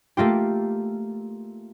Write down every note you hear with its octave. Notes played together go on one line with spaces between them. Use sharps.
A3 A#3 F4 G4